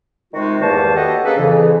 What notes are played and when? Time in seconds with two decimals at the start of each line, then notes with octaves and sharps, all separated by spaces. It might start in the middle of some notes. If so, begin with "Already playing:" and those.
0.34 C3 D#3 G#3 D#4 F4 F#4
0.61 E2 G2 D#3 A#3 C5 A5
0.96 F#4 G4 A4 B4 C#5 D#5
1.24 A#3 C#4 D4 G#4 A4 B4
1.38 F2 C#3 E3